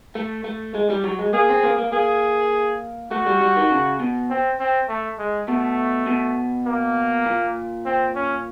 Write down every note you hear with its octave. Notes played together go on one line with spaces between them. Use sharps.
A3
A3
G#3
G3
F#3
G#3
A#3 G#4
C4
A#3
A#3
A#3 G#4
A3 F#4
G3
G3
D#3
C#3
B2
C4
C4
A3
G#3
B2 A3
B2
A#3
A#2
C4
C#4